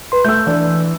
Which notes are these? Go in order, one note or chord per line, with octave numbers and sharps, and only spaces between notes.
B4 C6
A3 E6 G6
E3 D4